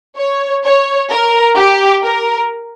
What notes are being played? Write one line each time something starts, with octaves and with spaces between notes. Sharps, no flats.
C#5
C#5
A#4
G4
A#4